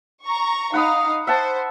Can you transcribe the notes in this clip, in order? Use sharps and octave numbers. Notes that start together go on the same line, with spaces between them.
A#5 C#6
D#4 F5 F#5 B5 D#6
C5 E5 F#5 A5